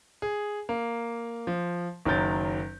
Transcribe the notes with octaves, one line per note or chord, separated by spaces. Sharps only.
G#4
A#3
F3
F#1 D#3 F#3 A#4 G6 A6